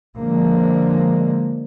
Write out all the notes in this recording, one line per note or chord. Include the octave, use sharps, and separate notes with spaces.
D3 F3 G#3 A#3